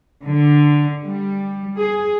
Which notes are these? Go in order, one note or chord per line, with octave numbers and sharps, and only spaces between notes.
D3
G3
G#4